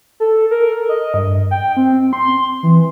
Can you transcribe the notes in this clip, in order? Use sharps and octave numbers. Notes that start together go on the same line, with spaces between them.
A4
A#4
D#5
G2
G5
C4
C6
E3